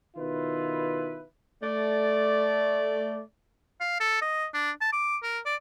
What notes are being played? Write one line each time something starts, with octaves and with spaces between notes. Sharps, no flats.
B2 D#3 E4 F4 B4
A3 D5
F5
A4
D#5
D4
A5
D6
A#4
D5